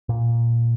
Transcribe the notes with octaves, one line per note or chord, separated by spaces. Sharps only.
A#2